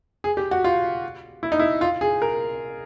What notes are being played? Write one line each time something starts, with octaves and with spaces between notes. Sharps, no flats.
G#4
G4
F#4
F4
E4
D#4
E4
F4
G#4
A#4